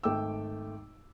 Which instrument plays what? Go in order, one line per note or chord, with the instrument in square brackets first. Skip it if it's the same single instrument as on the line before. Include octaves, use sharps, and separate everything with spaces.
[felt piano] G#1 A3 G5 D6 E6